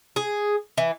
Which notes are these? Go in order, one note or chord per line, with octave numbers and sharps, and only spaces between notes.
G#4
E3